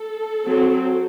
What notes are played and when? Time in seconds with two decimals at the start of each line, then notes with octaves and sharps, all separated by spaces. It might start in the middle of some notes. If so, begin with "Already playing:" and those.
Already playing: A4
0.48 F#3 C4